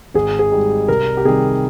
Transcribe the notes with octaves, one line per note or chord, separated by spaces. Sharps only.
G#1 G#4
G#4
G#2 G3
C2 A#4
G4
C3 D#3 G3 G#4